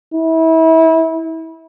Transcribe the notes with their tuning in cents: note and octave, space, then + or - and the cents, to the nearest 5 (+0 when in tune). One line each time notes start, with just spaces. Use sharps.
E4 -30